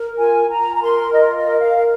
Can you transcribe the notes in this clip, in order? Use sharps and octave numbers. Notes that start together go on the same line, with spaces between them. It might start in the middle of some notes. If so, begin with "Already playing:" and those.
Already playing: A#4
F4 G#5
F4 A#5
A#5
A#4 C6
F4 D#5
D#5
A#4
F5
A#4